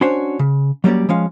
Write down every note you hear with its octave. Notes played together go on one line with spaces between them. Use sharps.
C#4 D4 F#4 C5 C#5
C#3
F#3 G3 A#3 C#4 D5
F3 G#3 C#4 F5